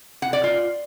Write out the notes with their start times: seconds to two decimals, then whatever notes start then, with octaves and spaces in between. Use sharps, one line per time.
0.22 F#5
0.33 D5
0.44 F4